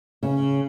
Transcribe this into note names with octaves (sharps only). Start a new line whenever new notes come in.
C#3